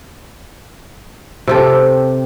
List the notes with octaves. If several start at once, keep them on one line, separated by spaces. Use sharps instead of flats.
C3 G4 A4